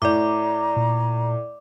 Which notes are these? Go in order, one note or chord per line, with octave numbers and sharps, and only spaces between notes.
A2 D5 A#5 D6
A#2